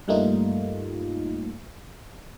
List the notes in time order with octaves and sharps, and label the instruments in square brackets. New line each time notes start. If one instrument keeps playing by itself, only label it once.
[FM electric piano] G2 G3 A3 A#3 D#4 F4